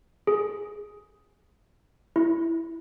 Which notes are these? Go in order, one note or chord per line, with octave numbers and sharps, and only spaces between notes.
G#4
E4